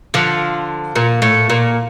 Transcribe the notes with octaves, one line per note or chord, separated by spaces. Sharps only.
D3 F3
A#2
A2
A#2